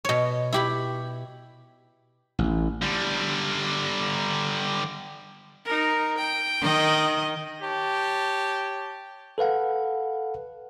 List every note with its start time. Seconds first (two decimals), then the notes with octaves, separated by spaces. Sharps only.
0.05 B2 C#5
0.53 E4 G4 B5
2.39 A1
2.82 D3 G3
5.65 D#4 A#4
6.17 G5
6.61 D#3 D#5
7.62 G4 C#5 A5
9.38 A4 B4 F5 F#5